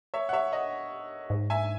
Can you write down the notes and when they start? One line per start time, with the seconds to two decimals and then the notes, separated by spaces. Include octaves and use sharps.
0.14 C#5 E5
0.29 F#5
0.33 C#5 E5
0.52 D#5 F#5
1.30 G#2
1.50 E5 G#5